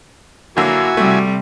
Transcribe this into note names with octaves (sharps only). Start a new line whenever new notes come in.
D3 F#3 A#3 E4 F#4 G#5
C3 G3 A3